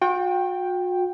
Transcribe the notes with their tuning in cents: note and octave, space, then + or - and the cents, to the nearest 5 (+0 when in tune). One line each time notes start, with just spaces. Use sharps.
F#4 -40 G5 +0